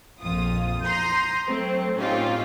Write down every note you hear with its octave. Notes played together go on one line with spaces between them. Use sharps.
A#1 F2 F4 D#6
A#5 C6 D#6 G6
F#3 A3 C4 C5
A2 C4 C#4 D#4 F4 G4